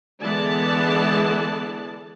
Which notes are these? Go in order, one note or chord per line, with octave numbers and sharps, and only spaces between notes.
D3 E3 G#3 B3 D5 A5